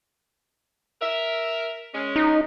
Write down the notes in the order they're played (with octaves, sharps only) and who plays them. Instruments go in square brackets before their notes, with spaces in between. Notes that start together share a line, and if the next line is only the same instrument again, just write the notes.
[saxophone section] A#4 E5
G#3 C#4
[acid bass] D#4